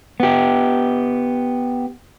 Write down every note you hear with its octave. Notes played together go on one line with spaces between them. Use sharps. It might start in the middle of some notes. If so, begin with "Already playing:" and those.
B3 G4